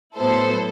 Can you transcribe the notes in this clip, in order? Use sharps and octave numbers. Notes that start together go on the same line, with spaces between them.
A2 F#3 B3 E4 A4 C5